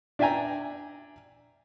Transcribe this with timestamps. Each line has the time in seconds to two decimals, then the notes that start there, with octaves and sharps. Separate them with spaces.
0.19 D4 D5 E5 G5 G#5 A#5